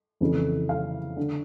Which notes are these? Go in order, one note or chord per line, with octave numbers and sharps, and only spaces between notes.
F2 C#3 E3
F5
D3